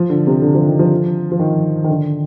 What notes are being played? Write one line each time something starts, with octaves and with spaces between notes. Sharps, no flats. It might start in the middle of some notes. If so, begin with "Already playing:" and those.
Already playing: F3
D3
C3
D3
F3
D#3
F3
F3
D#3
D#3
D3